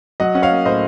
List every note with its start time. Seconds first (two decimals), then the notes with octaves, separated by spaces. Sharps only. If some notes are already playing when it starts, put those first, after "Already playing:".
0.20 F#3 D#5 F#5
0.35 C#4 F#5
0.42 C#5 F5
0.50 A#3
0.65 A2 C5 D#5